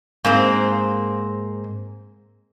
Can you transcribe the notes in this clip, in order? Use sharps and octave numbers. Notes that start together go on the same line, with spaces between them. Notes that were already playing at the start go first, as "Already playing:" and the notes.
G#2 A#3 C4